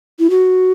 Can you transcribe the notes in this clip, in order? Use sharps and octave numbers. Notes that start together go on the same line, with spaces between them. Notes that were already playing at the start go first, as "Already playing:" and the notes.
E4
F#4